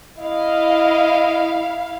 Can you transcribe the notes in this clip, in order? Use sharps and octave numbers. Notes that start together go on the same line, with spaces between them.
E4 D#5 F5